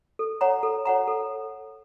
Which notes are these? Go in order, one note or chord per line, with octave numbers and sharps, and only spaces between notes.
A4
C#5 F#5 A#5
A4
C#5 F#5 A#5
A4